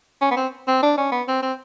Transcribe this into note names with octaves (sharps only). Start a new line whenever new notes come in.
C#4
B3
C4
C4
D4
C#4
B3
C4
C4